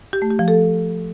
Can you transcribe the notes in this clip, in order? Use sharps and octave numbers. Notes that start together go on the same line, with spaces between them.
G4
A3
G4
F3
A4